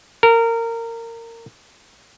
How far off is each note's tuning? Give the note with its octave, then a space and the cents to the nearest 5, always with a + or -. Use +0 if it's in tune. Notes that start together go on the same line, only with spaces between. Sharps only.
A#4 -20